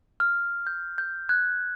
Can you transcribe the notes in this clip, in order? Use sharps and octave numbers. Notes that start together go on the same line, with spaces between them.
F6
G6
G6
F#6 G#6